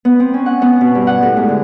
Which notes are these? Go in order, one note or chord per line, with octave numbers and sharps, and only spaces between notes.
B3
C4
C#4
F#5
B3
B2
G2
F#5
A2
G#2
D3